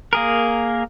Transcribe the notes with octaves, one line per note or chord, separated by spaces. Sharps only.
A#3 G#4 A#4